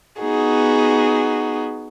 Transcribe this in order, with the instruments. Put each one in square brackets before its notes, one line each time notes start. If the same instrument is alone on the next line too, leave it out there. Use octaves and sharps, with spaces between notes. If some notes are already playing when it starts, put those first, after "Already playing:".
[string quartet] B3 D#4 F#4 G#4